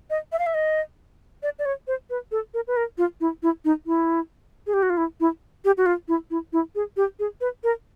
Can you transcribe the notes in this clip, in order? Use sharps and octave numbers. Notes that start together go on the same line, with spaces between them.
D#5
E5
F5
E5
D#5
D5
D5
C#5
C5
B4
A4
A#4
B4
A#4
F4
E4
E4
D#4
E4
G#4
G4
F#4
F4
E4
E4
G4
F#4
F4
E4
E4
E4
G#4
G4
G#4
B4
A#4